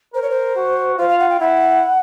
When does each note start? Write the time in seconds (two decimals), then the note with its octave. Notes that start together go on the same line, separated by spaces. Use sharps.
0.14 A#4 C5
0.22 C#5
0.30 C5
0.56 F#4
0.98 F4 C5
1.08 F5
1.18 F#5
1.29 G5
1.40 E4 F#5